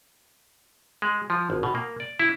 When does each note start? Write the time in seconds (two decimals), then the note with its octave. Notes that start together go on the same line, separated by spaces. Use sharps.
1.02 G#3
1.30 F3
1.50 G#1
1.63 B2
1.75 A#3
2.00 D5
2.19 E4